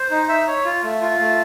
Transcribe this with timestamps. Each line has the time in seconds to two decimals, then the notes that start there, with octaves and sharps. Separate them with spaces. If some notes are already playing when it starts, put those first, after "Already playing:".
Already playing: C5
0.11 D#4
0.29 E5
0.47 C#5
0.65 F4
0.83 A3
1.02 F4
1.20 A3